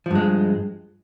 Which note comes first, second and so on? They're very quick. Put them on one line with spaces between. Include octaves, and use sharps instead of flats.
F3 G2 G#3